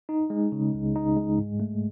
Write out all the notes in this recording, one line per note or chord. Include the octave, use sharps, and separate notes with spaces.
D#4
G#3
C#3
C#2
D#4
G#3
G#2
A3